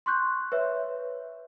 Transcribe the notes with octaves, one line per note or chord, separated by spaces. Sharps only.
C6 C#6 F#6 G6
B4 C#5 E5